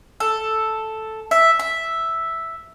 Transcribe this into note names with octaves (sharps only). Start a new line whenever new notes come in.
A4
E5
E5